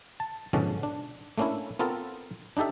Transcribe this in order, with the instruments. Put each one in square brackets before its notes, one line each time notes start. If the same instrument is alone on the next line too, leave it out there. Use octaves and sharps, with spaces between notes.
[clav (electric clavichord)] A5
G#2 B2 D3 F3 C#4 D4
D4
A3 A#3 C#4 D4 E4
B3 C4 F4 A4 A#4
D4 D#4 G4 A4 E5